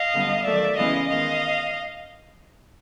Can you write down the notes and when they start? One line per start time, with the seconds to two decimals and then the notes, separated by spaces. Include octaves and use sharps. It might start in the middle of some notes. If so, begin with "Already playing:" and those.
Already playing: D#5 F5
0.14 D3 G3 B3
0.45 D#3 F#3 A3 D5 E5
0.77 C#3 E3 G#3 B3 D#5 F5
1.09 D#3 G#3 B3 D#5 F5